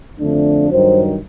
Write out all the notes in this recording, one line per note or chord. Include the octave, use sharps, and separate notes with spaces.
F2 D3 F3 A3 D4
G2 D#3 F#3 C5